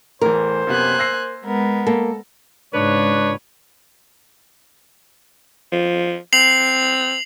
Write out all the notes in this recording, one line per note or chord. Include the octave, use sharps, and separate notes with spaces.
E2 A2 E3 A#4 C5
F#2 C3 A#3 B3 G#5 F#6
E6 A#6 C7
G#3 B3 A#4
A#3 A4
C#2 G#2 D4 B4 C#5
F3
C4 C7 F7 F#7